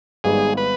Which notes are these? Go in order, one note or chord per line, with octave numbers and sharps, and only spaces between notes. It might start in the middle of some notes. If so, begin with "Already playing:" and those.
G#1 G#2 G3 B3 D#4 G#4
B4